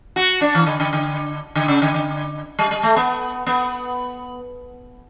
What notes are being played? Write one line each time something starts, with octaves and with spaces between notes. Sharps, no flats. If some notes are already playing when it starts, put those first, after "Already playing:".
F#4
D4
E3
D3
D3
D3
D3
C#3
D3
D3
G3
G3
A3
B3
B3